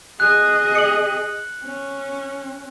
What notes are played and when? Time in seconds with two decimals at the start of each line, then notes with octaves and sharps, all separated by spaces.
0.20 G#4 D#5 F#6
0.75 C#7 F#7
1.63 C#4